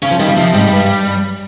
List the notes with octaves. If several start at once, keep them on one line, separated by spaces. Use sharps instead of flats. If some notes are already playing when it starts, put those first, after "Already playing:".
C#3 C#4
F3
D#3 G3
C#3
C3 F3
G#2 G3
G2